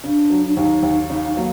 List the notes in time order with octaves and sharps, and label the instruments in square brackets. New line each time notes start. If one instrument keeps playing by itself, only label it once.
[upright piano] C#3 [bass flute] D4
[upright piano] F#3
[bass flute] D4
[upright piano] D#2 [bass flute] D#4
[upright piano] D#2
[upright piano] C#3 [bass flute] D#4
[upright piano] F#3 [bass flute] A#3